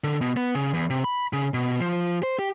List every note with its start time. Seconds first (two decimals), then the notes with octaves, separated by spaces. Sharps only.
0.04 D3
0.21 B2
0.37 B3
0.55 C#3
0.74 E2
0.90 C3
1.04 B5
1.33 C#3
1.54 B2
1.80 F3
2.23 C5
2.39 G4